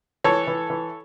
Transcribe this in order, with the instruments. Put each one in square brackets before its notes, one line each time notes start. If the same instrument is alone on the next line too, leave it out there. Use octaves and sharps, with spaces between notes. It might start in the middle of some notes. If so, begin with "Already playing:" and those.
[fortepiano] E3 A4 C#5
E3
E3